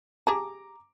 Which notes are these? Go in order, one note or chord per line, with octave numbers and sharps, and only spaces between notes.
G4 G#4 A5 A#5 D6